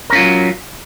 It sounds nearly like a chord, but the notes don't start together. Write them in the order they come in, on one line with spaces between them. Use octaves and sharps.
A#4 C#4 F4 F#3